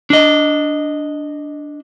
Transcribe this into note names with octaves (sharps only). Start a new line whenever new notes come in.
D4 D#5